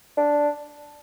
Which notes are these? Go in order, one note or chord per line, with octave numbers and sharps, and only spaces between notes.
D4